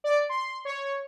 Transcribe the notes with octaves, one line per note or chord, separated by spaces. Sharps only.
D5
C6
C#5